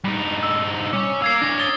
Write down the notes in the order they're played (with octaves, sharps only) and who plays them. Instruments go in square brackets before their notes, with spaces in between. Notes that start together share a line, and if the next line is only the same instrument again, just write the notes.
[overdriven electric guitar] G2 D#4
[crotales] E6
[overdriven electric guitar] C#4 C#5 [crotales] D6
[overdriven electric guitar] A#4 F5 [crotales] E6 G#6 C7
[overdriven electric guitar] D4 C#5 [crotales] A#6
[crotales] D#6 A6 G7